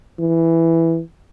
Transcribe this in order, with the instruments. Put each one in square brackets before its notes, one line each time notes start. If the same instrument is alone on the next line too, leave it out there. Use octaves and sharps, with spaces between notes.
[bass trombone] E3